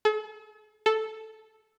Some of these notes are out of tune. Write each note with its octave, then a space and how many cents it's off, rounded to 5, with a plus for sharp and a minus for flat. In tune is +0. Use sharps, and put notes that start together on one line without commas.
A4 -45
A4 -5